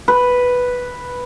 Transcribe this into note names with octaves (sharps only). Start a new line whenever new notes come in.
B4